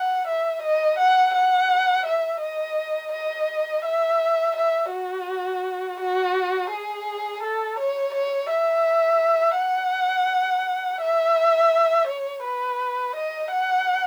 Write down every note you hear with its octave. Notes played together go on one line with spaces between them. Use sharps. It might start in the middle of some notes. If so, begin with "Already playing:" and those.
Already playing: F#5
E5
D#5
F#5
F#5
E5
D#5
D#5
E5
E5
F#4
F#4
G#4
A4
C#5
C#5
E5
F#5
E5
C#5
B4
D#5
F#5